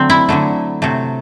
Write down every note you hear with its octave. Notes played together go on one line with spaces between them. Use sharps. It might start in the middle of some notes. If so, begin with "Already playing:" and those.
Already playing: D3 F#3 A3 C4
E4
D3 F#3 A3
C3 F#3 A3